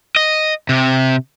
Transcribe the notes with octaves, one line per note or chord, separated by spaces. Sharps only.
D#5
C3